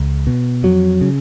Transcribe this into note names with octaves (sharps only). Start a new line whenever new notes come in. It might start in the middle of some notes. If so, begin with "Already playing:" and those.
Already playing: C#2
B2
F2 F#3
C#3